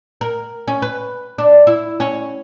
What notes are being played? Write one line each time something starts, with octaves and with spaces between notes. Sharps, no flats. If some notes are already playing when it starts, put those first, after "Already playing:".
A#4
C#4
B4
D4
E4
C#4